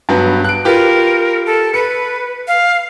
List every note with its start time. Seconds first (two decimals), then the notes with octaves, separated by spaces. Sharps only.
0.09 G2 F#3 B3
0.44 F#6 D7
0.65 F4 G4 A#4 B4
1.46 A4
1.74 B4 C#7
2.48 F5